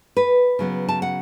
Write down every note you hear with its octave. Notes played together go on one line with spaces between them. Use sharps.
B4
C#3 F#3 B3
A5
F#5